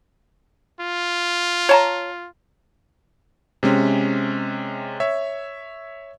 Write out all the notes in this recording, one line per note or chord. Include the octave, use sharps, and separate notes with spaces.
F4
C#5 A5 A#5
C3 G#3 C#4
C#5 E5